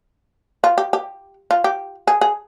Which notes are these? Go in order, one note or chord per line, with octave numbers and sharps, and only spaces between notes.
F4
G4
G4
F4
G4
G#4
G#4